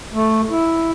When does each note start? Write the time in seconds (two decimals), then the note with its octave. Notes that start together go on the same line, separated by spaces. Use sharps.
0.14 A3
0.50 E4